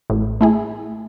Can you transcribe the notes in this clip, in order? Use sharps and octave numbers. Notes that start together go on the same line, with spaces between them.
A1 A2
A3 E4 G#4